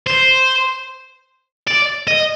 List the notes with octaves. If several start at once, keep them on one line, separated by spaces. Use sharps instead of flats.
C5
D5
D#5